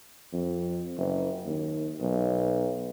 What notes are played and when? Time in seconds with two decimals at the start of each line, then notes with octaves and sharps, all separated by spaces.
0.33 F2
0.98 F#1
1.46 D#2
2.00 B1